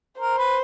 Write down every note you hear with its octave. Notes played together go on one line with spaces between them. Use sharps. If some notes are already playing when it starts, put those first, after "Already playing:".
A#4 C5
B4